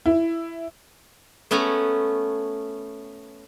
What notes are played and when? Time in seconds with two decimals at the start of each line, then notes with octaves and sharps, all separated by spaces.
0.06 E4
1.51 A3 B3 C#4 G#5 A#5